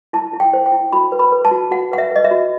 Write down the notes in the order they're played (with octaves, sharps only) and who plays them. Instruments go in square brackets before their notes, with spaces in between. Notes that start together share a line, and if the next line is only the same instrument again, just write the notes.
[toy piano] E4 A5
E4
G5
C5
G5
E4
F#4 B5
B4
B5
B4
A5
F#4
F#4 F#5
B4 F#5
E5
B4 D#5
E5
F#4